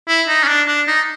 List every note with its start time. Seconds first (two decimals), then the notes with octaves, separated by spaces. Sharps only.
0.08 E4
0.28 D#4
0.43 C#4
0.48 D4
0.68 D4
0.87 D#4